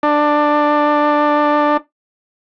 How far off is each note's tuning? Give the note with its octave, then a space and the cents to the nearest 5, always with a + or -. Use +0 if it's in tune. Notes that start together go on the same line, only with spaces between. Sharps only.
D4 +15